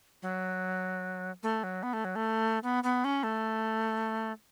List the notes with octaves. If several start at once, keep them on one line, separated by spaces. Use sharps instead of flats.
F#3
A3
F#3
B3
A3
F#3
A3
B3
B3
C#4
A3